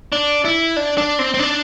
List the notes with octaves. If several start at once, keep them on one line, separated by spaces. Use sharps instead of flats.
D4
E4
D4
D4
C4
C4
D4